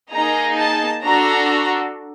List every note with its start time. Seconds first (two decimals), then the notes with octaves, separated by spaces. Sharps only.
0.12 A#3 D#4 G#4 A#5
0.58 A5
1.03 D4 F#4 A4 A#5